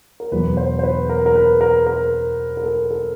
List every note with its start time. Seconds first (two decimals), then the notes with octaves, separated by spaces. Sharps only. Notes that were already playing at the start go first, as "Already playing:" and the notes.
0.20 A#4
0.32 E2 B2 F#3 B4
0.57 C5
0.79 C5
0.83 B4
1.09 A#4
1.26 A#4
1.35 B4
1.61 A#4
1.87 A#4
2.57 A#4
2.64 A4
2.91 A4